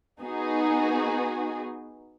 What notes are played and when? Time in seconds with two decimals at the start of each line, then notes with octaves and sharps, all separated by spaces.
0.21 B3 D#4 F#4 G#4